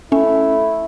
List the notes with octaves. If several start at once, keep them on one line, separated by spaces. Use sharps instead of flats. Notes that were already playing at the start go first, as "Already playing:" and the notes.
A3 C#4 E4